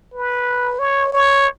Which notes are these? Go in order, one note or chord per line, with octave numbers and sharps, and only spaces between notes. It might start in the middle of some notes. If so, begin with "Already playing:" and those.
B4
C#5
C#5